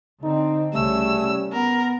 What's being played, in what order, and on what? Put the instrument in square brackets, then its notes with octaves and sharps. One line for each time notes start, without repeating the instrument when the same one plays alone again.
[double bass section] D3 C4 [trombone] D#4
[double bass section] C2 C#3 C#4 [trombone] G3 [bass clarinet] A3 [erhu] E6
[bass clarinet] B3 [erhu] A#4